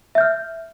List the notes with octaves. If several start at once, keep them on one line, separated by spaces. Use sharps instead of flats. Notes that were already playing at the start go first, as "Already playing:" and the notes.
E5 F6 G6